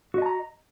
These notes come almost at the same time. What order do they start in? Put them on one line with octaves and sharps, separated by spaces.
F#4 D#5 A5 A#5